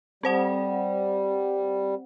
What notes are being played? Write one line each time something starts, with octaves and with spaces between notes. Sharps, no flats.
G3 C4 C5 F#5